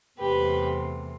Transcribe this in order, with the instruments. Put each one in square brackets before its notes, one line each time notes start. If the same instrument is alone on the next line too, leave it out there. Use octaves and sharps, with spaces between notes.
[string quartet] E2 C3 E3 A3 C4 G4 B4